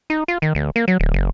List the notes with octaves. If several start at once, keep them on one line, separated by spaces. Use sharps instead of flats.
D#4
F4
D#3
D2
A#3
F#3
D1
F#1